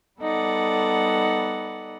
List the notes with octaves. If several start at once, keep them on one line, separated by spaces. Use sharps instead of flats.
G3 B3 D#4 A4 D5 F#5